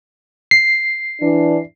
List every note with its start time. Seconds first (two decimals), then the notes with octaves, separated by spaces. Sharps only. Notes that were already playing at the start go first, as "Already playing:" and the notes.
0.51 C7
1.21 E3 D4